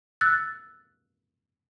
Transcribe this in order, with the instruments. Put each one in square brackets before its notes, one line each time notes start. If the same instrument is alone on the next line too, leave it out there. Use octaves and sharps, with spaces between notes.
[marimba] E6 F#6 A6